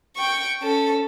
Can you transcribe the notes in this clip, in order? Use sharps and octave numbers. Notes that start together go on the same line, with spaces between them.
G5 C#6
C#4 A4